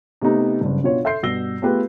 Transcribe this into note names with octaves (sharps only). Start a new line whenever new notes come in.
C3 A3 B3 D#4
F#1 G2
B2 D4 F4 C#5
A4 E5 C6 G6 C7
G2 B2 E6 A#6 G7
A3 B3 F4 G4 G#4 B4